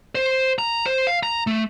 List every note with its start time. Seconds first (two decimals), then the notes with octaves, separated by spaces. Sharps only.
0.15 C5
0.59 A#5
0.86 C5
1.07 F5
1.23 A#5
1.47 A3